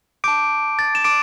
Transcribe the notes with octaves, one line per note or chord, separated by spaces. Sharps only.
A5 D6 G6 D7
A6
E7
D6 D7